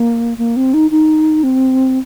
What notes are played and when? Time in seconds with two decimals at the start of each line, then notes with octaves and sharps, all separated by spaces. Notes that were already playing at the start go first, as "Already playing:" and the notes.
Already playing: A#3
0.38 A#3
0.56 C4
0.74 D#4
0.91 D#4
1.43 C4